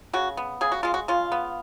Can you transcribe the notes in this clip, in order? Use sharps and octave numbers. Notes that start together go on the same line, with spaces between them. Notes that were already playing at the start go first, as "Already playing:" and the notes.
C#3 F#4
B3
C#3 G#4
F#4
G#3 F4
F#4
C#3 F4
B3